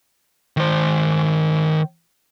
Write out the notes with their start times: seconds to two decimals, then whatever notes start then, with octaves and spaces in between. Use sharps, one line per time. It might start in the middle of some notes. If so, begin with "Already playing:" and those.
0.57 D#3 C5